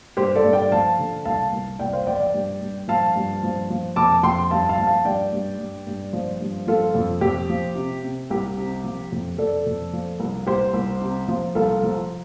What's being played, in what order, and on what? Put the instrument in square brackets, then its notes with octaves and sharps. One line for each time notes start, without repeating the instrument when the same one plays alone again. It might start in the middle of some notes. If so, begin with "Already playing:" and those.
[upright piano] G2 G4 C5
A4 D5
G2
D5 G5
F3 F5 A5
D3
C2 F5 A5
C2
C2 D5 G5
C5 F5
F3 D5 G5
D5 G5
G2
G2
F3 F5 A5
G2
F3
F3
F2 A5 D6
F2 G5 C6
G2 F5 A5
F5 A5
F3
F5 A5
G2 D5 G5
G2
G2
G2
F3
G2
F3 F4 A4
F2
F2 G4
F3
C3
C3
C2 G4
C3
F3
F2
F2 A4 D5
F2
F3
C2
C2 G4 C5
C2
C3
F3
C2 F4 A4
F3